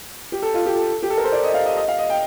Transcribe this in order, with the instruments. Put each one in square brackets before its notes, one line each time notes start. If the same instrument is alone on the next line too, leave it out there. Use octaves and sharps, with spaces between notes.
[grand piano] G4
A4
F4
G4
A4
G4
A4
A#4
C5
D5
D#5
F5
D#5
D#5
F5
D#5
G5